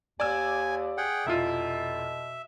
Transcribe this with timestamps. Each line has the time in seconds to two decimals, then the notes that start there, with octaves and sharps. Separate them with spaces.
0.20 D#2 D5 G#5 E6
0.97 G#4 F#5 G5
1.26 F1 B2 E4 F4 E5